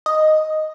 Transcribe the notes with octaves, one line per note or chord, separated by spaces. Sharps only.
D#5